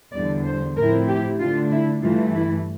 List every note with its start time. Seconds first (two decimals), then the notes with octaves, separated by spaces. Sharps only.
0.14 E2 D3 G3 D5
0.45 C5
0.76 A2 F3 C4 E4 A#4
1.08 G4
1.40 D3 A3 D4 F4
1.71 E4
2.02 G2 E3 A3 F4
2.34 E4